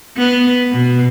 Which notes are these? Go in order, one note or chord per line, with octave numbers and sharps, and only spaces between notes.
B3
B2